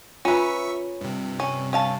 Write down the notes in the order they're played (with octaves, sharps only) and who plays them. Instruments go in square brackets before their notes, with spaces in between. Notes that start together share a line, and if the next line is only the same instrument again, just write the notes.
[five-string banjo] C#4 B4 [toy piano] F4 A#5 [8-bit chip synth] E5 C#6
[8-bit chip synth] G2 C3
[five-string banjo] C#4
C#4 F5 A5